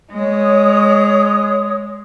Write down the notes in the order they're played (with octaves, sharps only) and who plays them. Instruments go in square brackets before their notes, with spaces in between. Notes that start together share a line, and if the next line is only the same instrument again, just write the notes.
[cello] G#3 [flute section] C#5 D#6